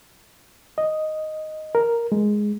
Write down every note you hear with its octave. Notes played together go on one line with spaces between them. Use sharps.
D#5
A#4
G#3